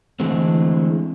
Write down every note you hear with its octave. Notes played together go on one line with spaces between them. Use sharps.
D3 E3 G#3 A3 C4